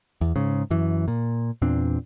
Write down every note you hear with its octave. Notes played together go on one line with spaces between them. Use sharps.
E2
G#2 C#3
F#2 E3
A#2
E2 A#2 C4 D4